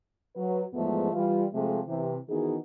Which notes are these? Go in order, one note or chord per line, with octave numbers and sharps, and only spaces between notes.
F#3 B4
E2 G#2 F3 G#3 A3 B3
E3 G3 F4
C3 F3 G#3 A3
C3 E3
D#3 E3 B3 D#4 F#4 G#4